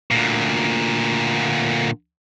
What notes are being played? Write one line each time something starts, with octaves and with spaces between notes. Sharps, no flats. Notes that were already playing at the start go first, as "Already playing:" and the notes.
D2 A#2